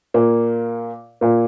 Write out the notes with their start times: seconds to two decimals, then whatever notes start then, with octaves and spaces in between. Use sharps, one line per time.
0.14 A#2 A#3
1.21 A#2 A#3